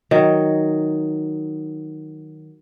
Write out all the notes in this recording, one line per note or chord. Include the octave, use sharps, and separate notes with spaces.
D#3 F#3